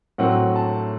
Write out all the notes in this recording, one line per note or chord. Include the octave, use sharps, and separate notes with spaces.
A2 F#3 C4 F#5
A5